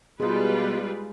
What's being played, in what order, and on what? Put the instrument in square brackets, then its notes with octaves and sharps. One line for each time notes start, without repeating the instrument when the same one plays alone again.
[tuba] B2 [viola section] G3 F4 B4 [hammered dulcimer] G#3 D#4 [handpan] G#4